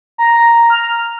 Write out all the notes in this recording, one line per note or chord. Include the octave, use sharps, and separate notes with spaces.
A#5
F6